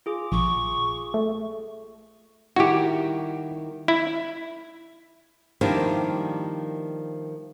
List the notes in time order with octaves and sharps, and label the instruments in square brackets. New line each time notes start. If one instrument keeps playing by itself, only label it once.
[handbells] F4 G#4 D6
[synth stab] A#1 [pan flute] C#6
[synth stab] A3
[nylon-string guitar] D#3 G3 E4 [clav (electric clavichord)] F#4 G4
[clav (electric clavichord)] E4
[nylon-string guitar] D#3 F3 G3 A#3 D4 E4